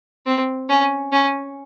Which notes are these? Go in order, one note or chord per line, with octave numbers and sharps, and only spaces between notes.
C4
C#4
C#4